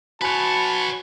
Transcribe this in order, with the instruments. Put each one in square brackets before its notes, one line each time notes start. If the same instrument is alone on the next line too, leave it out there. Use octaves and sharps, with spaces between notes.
[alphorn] F#4 [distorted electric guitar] B4 C#5 [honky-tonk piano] G#5 B5 F#6 [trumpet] A5